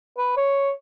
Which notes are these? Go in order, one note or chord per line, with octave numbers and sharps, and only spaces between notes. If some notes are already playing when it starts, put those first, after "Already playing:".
B4
C#5